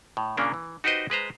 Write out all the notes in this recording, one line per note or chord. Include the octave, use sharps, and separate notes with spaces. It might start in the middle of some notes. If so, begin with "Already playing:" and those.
A2
A#2 C#3 A#3 C#4 D4
E3
D#4 F#4 G4 B4 C5 D#5
G#3 B4 C5 A#5